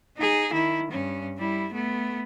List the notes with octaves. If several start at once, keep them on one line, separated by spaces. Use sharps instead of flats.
D#4 G#4
D#3 E4
G2 C#4
G3 E4
A3 B3